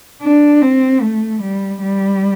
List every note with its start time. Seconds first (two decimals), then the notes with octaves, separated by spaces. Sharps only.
0.23 D4
0.62 C4
1.02 A3
1.42 G3
1.81 G3